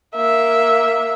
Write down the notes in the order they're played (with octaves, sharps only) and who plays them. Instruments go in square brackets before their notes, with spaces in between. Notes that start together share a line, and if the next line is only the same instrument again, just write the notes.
[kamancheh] A#3 E5